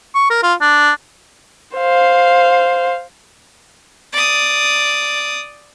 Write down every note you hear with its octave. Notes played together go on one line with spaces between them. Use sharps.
C#6
A#4
F4
D4
C5 F5
D5 D#6